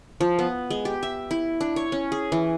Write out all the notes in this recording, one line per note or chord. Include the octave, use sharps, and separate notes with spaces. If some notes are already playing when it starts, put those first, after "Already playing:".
F3
B3
G#3
G4
E5
E4
D4
C#5
C#4
G#4
E3